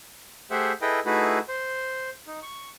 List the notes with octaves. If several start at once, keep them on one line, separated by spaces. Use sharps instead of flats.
A3 G4 G#4 C5 E5 F#5
E4 G#4 A4 B4 D#5 G5
A3 D#4 E4 F#4 G#4 B4
C5
D#4
C#6